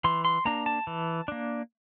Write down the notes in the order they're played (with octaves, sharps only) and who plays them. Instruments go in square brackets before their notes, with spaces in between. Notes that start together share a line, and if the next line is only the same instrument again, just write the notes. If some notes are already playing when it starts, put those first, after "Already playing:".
[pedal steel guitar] E3 C6
C6
A#3 D4 A#5
A5
E3
A#3 D4